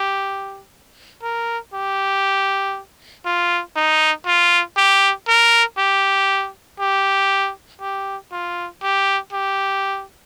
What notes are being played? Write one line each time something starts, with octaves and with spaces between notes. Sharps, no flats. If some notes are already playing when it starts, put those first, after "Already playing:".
Already playing: G4
A#4
G4
F4
D#4
F4
G4
A#4
G4
G4
G4
F4
G4
G4